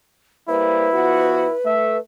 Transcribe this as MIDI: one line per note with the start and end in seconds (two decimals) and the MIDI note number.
0.49 0.88 55
0.49 0.88 58
0.49 1.55 64
0.49 1.99 71
0.49 0.88 72
0.93 1.48 53
0.93 1.48 59
0.93 1.48 66
1.66 1.98 57
1.66 1.98 76